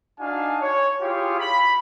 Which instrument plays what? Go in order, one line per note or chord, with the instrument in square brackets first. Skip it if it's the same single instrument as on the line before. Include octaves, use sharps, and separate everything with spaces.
[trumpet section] D4 D#4 F#4 F5 G#5 A5
C#5
E4 F4 G4 G#4 C#5 F5
B5